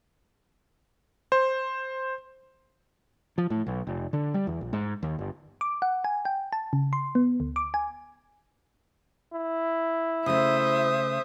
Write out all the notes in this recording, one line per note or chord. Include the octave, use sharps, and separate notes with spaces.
C5
F3
A2
B1
F1
D3
G3
E2
A#1
G#2
D#2
G1
D6
F#5
G#5
G5
A5
C#3
C6
B3
D2
D6
G#5
E4
C#3 A3 C5 E5 D#6